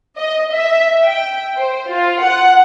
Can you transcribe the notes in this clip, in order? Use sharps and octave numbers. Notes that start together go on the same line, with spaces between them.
D#5
E5
G5
C5
F4
F#5